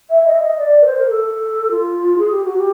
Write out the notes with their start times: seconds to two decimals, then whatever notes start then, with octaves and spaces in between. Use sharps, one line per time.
0.10 E5
0.26 D#5
0.34 E5
0.42 D#5
0.58 D5
0.81 B4
0.86 C5
0.98 A#4
1.09 A4
1.70 F4
2.18 G#4
2.31 G4
2.44 F#4
2.57 G4